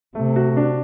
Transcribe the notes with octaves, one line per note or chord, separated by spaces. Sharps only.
C3 A3
F#4
D4